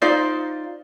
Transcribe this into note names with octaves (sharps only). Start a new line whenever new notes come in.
D#4 F4 C5 D5